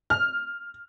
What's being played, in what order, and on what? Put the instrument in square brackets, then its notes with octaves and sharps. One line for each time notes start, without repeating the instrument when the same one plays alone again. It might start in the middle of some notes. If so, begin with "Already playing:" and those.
[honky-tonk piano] F6